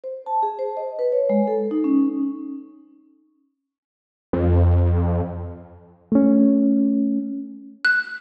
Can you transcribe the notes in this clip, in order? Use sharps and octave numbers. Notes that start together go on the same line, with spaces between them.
C5
A5
G#4
C5
D#5
B4
C#5
G#3
A4
D#4
C#4
F2
A3 C#4
F#6